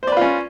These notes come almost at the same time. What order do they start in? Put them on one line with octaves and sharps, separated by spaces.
C5 D5 B4 F4 C#4